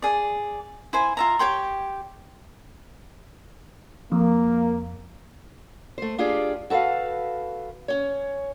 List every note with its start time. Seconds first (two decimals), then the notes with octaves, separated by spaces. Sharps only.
0.02 G#4 D5
0.93 E4 C5 G#5
1.17 F4 E5 A#5
1.39 G4 C#5 G5 C6
4.12 F2 A#3
5.98 A3 C5
6.18 D4 F4 G4 G#4 D5
6.70 F#4 A4 B4 E5 F5
7.88 C#4 C#5